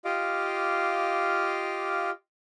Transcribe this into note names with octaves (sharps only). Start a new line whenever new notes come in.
F4 G4 D#5 F5 D6